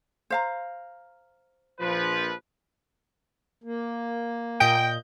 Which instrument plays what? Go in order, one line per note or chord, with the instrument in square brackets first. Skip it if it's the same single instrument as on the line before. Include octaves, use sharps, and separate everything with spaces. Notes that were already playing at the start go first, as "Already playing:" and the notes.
[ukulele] C5 F5 A#5
[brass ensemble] A#1 F3 B4
[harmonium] A#3
[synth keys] A#2 D#5 G6 [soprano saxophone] G5